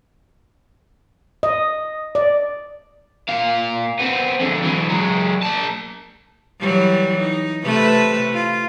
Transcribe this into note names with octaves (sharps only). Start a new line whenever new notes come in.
D#5
D5
A#2 F5
B3 C4
F2 D3
E3 F#3
F#3 G#3
A#3 A5
E3 F#3 G3
D#4
C3 A3 B4
F4